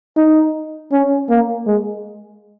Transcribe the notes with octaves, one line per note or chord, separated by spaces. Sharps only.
D#4
C#4
A#3
G#3